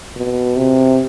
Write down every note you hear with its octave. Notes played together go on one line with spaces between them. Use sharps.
B2
C3